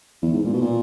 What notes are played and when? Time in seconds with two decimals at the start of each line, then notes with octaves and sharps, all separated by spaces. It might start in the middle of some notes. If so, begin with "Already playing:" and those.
0.22 E2
0.33 G#2
0.45 A#2
0.53 B2
0.61 A#2